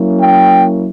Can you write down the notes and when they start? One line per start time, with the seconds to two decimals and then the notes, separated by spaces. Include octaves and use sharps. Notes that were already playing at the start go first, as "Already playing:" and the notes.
Already playing: F#3 A#3 C#4 E4
0.20 G5